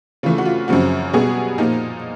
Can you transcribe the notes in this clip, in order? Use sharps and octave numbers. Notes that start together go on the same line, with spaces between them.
C#3 E3 A3 F4
F#4
F4
F#2 C#3 F3 F#4
B2 G3 B3 F#4 G#4
A#2 F3 A#3 D#4